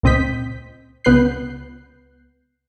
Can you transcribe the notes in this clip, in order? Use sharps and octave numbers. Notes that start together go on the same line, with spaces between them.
C#2 A#2 C4 D#5 G6 B6
C#2 B3 B4 F#6 G6 C7